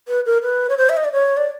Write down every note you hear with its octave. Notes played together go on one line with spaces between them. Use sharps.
B4
A#4
B4
C#5
C5
E5
D#5
D5
C#5
D5